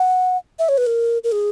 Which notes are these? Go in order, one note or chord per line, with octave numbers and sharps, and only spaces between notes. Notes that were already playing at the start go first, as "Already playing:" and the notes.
Already playing: F#5
E5
C#5
B4
A#4
A#4
G#4